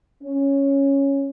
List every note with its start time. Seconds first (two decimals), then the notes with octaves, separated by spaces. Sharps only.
0.24 C#4